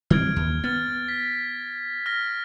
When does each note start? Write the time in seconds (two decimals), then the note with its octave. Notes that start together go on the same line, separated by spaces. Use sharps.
0.10 D#3 G3 C4 F6 G#6 D7
0.36 D#2
0.64 B3 F6 A6
1.08 B6
2.06 F6 A#6